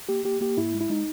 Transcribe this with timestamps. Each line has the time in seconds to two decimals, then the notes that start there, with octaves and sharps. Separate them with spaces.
0.09 A#3 G4
0.24 A#3 G4
0.41 A#3 G4
0.57 G#2 E4
0.74 G#3
0.81 E4
0.89 G#3 D#4